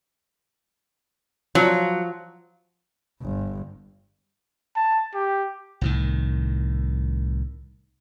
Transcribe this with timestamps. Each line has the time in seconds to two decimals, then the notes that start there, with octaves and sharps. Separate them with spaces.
1.55 F3 F#3
3.22 G1
4.76 A5
5.15 G4
5.81 C2 A2 D#3